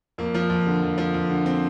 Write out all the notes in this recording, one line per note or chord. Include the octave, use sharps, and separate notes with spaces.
F2 A#3
F3
F2
D3
F2
F3
F2
D3
C4